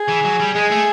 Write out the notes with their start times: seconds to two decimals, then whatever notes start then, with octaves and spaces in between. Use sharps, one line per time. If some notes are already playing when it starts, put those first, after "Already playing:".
Already playing: G#4
0.08 E3
0.24 F#3
0.40 G3
0.55 G#3 G#4
0.71 A3